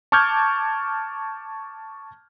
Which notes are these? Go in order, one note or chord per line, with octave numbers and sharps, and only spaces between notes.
A5 C#6 D6 F6 G6 G#6